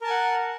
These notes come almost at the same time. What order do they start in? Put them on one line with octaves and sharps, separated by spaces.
A#4 A5 G#5 F#5